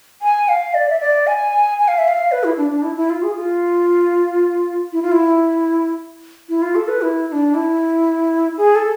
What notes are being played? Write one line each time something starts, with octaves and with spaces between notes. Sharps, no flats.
G#5
F5
D5
E5
D5
G#5
G#5
F5
E5
F5
B4
E4
D4
D4
E4
E4
F4
G#4
F4
E4
F4
E4
E4
F4
A4
B4
E4
E4
D4
E4
G#4
A4